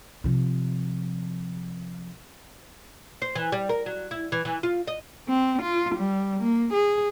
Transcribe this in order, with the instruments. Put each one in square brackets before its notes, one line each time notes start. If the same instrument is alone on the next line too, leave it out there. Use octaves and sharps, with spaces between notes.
[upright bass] C3 F3
[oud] C5
E3
G3
A#4
F#3
E4
E3
E3
F4
D#5
[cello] C4
F4
G3
A#3
G#4